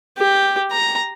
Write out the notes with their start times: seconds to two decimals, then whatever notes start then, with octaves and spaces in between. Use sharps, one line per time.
0.18 G4
0.71 A#5